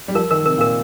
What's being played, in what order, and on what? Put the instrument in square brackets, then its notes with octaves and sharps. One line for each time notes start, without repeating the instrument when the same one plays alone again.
[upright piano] G3
[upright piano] F3 [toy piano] A#4
[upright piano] D#3 [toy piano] A#4
[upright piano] C3 [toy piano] A#4
[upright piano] A#2 [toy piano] A#4